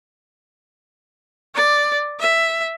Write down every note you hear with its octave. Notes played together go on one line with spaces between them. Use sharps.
D5
E5